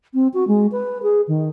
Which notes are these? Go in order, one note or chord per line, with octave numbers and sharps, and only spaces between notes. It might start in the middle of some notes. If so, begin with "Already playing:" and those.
C4
F#4
G#3
B4
G#4
D#3